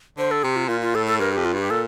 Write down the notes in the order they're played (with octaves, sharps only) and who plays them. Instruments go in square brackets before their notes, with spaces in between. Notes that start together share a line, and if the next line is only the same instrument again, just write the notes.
[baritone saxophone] D3 [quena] C5
[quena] A4
[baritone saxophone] C3 [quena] G4
[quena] F4
[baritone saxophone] A#2 [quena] F4
[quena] F4
[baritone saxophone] A2 [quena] A4
[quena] A4
[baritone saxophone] G2 [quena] A#4
[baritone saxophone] F2 [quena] G4
[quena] F4
[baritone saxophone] G2 [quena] G4
[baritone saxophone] A#2 [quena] A4